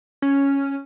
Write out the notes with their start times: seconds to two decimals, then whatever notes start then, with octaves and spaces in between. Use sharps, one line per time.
0.22 C#4